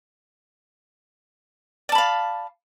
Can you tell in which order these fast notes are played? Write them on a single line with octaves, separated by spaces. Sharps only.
D5 A5 B5 F5